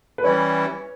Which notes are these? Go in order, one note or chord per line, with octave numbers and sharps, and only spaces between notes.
B4
E3 G3 C#4 E4 C#5